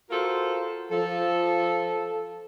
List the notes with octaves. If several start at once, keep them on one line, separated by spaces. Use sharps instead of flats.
F4 F#4 A4 A#4 C5
F3 A4